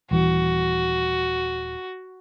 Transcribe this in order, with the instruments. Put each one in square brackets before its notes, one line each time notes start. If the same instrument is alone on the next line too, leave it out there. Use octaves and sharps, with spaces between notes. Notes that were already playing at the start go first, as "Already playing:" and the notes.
[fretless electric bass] D#1 E3 [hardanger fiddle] F#4